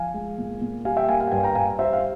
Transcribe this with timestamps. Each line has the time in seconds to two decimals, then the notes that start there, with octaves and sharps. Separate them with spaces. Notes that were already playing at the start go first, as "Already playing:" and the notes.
Already playing: F3 F5 G#5
0.14 G#3
0.38 A#2
0.61 A#2
0.85 G3 F5 G#5
0.97 E5 G5
1.08 A#3 F5 G#5
1.20 F5 G#5
1.27 G5
1.32 G2 F5 G#5
1.43 G5 A#5
1.55 G2 F5 G#5
1.79 G3 C5 E5
1.93 F5